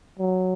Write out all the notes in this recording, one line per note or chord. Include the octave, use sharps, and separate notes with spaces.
F#3